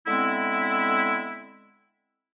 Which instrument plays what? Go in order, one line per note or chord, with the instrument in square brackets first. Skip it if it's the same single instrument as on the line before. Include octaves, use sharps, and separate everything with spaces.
[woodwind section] D3 G#3 B3 C4 E4